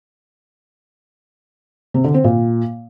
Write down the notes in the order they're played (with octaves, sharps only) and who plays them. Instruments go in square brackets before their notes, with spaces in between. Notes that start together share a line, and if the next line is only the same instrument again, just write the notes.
[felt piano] C3
D3
C4
A#2